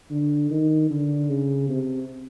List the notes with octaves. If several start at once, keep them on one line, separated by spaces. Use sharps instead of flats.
D3
D#3
D3
C#3
C3